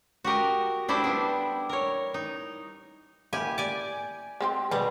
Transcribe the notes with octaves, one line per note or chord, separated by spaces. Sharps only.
F#4 G4 A#4 D#5
D4 E4 G4 A4 C5 D5
G3 B3 D4
A#4 C#5
D#4
A#3 E4 G4 G#5
D5 G#5
G#3 C4 G4
B2 G3 G#4